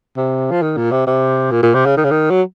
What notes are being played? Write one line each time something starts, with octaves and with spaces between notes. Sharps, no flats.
C3
F3
D#3
A#2
C3
C3
A#2
A#2
C3
C#3
D#3
C#3
D#3
F#3